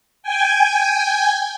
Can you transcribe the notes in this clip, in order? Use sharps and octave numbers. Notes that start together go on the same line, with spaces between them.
G5 G#5